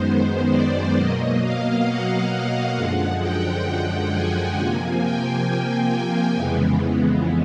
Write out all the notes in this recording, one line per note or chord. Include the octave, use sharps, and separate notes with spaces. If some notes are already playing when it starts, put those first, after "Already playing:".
Already playing: F#2 D#3 G#3 B3 C5
D5
B2 F#3 A#3 D#5
F5
F#5
F#5
F#2 D3 F3 G#3
G5
G#5
C3 F3 A#3
G5
G#5
F2 C#3 E3 G#3 B3